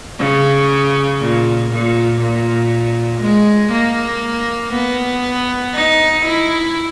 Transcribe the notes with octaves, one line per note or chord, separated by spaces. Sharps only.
C#3
A#2
A#2
A#2
G#3
A#3
B3
D#4
E4